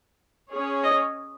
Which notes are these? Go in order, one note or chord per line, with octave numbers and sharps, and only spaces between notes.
C#4 G#4 C#5
D#5